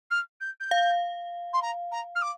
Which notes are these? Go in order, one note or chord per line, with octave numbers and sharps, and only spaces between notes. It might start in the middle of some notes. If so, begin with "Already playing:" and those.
F6
G6
G6
F5
C6
A#5
A#5
F6
D6